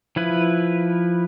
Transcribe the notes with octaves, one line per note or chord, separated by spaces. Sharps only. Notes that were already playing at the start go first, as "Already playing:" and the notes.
F3 E4 B4